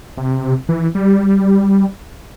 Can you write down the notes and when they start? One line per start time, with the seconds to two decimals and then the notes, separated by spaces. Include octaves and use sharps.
0.17 C3
0.69 E3
0.95 G3